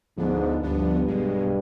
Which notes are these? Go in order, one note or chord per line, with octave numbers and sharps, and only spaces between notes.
D2 G#2 D3 F3 B3 D4
D2 G2 D3 F3 B3 D4
B1 B2 G#3